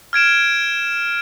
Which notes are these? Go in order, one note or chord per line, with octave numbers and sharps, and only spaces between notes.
F6 G#6 D7 E7